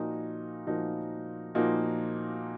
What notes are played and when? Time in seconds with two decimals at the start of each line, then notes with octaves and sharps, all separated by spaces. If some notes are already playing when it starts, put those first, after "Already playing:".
Already playing: A#2 F3 A#3 D#4 F#4
0.67 A#2 F3 A#3 D#4 F#4
1.55 A#2 F3 A#3 D#4 F#4